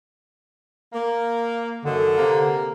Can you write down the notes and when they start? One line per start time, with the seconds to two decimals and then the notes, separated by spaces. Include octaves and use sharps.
0.93 A#3
1.85 F#2 D3 D#3
2.17 C3 A#3